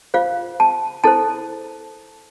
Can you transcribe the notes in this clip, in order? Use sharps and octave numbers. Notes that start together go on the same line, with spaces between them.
F4 C5 F5
A5
E4 A4 C5 A5